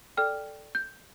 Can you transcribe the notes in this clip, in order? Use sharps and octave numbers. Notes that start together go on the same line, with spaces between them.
A4 D5 G5 F6
G6